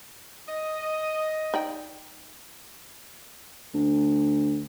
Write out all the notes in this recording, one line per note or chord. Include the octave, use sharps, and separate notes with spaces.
D#5
D#4 D5 G5
D2